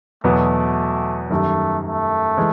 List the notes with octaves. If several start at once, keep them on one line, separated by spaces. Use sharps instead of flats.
E2 B2 F#3 A3 B3
F#2 D#3 G3 A3
A3
E3 G#3